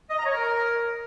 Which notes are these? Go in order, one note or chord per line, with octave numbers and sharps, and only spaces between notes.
D#5
A#5
C#5
A#4